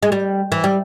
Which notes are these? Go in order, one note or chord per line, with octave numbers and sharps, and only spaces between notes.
G#3
G3
E3
G3